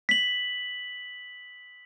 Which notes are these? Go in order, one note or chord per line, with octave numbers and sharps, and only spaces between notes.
B6 F#7